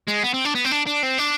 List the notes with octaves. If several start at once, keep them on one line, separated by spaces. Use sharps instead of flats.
G#3
B3
C4
D4
B3
C4
D4
D4
C4
D4